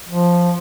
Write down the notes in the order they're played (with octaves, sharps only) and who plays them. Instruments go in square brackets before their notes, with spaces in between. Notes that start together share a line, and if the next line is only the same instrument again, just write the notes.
[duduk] F3